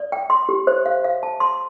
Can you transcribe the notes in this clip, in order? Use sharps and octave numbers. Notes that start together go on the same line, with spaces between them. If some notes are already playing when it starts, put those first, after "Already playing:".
Already playing: D5
G5
C6
G4
C5
F5
F5
A5
C6